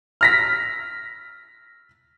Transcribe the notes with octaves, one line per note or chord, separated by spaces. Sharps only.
F6 A#6 B6